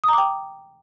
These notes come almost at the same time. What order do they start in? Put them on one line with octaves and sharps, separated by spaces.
D#6 A#5 D6 G5